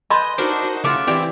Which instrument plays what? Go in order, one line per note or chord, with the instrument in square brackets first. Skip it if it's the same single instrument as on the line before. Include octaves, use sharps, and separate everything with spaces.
[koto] B4 G#5 A5 [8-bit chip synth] D#5 G6 [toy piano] B5 C6
[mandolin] D4 [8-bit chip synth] D#4 F#4 C5 [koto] A#4
[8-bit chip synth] C#3 [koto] A3 F4 F#4 [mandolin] E5 D6
[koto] E3 G4 D5 [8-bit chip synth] C4 E4